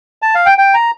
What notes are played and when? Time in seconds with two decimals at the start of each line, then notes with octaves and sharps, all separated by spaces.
0.22 A5
0.35 F5
0.46 G5
0.58 G5
0.74 A#5